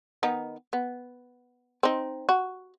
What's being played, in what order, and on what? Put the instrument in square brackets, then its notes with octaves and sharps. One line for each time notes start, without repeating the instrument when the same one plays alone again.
[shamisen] D#3 B3 D#4
B3
C4 D#4
F#4